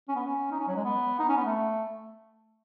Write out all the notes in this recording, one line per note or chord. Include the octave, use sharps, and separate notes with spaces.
C#4
B3
C#4
D#4
C#4
F#3
G#3
B3
D#4
C#4
B3
A3